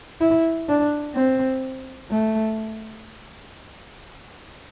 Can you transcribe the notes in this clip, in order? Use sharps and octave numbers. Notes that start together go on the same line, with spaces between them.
E4
D4
C4
A3